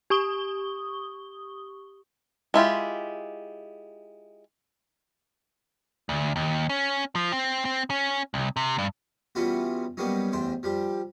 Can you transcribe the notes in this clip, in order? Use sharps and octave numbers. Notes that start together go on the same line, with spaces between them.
G4 C#6 D#6 G7
G#3 E4 F4 G4
D2
D#2
C#4
F3
C4
C4
C#4
C2
C3
G2
E3 G3 B3 C#4 F4 F#4
F#3 G3 A#3 B3 C#4 D#4
A1 E2 C5 G5
F3 G3 G4